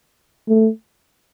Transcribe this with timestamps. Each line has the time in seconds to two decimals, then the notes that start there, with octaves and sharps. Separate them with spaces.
0.48 A3